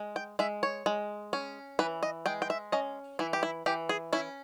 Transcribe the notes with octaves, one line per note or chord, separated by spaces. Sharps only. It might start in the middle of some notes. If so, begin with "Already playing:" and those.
Already playing: G#3
G5
G#3 E5
C#5
G#3
C#4
E3 B4
D#5
G#3 G5
G5
E5
C#4 D#5
E3 E4
G4
E4
E3 G4
G#4
C#4 E4